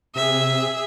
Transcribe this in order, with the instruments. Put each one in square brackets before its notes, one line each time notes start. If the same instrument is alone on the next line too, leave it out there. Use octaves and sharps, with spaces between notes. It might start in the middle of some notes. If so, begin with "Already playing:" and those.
[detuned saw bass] C3 [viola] G#4 E5